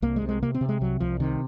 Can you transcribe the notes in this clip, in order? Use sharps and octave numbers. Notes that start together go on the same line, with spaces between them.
C2 A#3
G#3
C3
G#3
C3 A#3
C4
C3
G#3
C2 F#3
C2 F3
C3 D#3